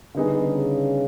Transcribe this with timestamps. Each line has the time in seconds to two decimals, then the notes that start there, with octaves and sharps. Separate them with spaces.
0.15 D3 G3 B3 D#4 G#4
0.46 C#3